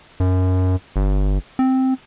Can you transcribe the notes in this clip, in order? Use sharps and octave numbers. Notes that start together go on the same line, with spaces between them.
F#2
G1
C4